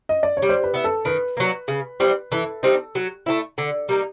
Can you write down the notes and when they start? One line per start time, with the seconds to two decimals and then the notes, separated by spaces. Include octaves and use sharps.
0.09 D#5
0.23 D5
0.37 C#5
0.42 G3
0.49 C5
0.64 B4
0.74 B3 E4
0.84 A4
1.05 D#3 B4
1.37 F#3 A#3
1.68 C#3
2.00 E3 G3 C4
2.32 E3 A4
2.63 G3 C4 D#4
2.95 F#3
3.26 A3 C4 E4
3.58 D3
3.89 G3 A#3 D#4